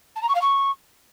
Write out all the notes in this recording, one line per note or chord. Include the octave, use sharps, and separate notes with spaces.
A5
A#5
C#6
F5
C#6